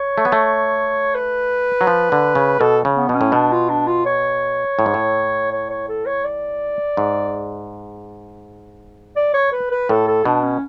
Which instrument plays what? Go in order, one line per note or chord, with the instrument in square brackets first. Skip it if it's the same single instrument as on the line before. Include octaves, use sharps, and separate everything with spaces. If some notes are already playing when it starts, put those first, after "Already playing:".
Already playing: [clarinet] C#5
[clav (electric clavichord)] A3
B3
A3
[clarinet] B4
[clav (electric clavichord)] F#3
F3
D3
C#3
[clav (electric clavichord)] B2 [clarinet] A4
[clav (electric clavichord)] C#3
[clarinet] B3
[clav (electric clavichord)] B2 [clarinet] C#4
[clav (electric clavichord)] A2
[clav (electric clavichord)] B2 [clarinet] D4
[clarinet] F4
D4
F4
C#5
[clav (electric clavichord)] A2
G#2
A2
[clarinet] C#5
C#5
A4
C#5
D5
[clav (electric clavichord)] G#2
[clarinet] D5
C#5
B4
B4
[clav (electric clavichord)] A2 [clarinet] A4
[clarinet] A4
[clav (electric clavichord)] B2 [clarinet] D4
[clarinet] C#4